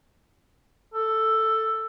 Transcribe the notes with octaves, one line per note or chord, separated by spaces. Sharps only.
A4